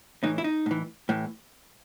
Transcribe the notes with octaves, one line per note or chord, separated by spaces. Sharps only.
A2 E3 D#4
E4
D#4
A2 E3
A2 E3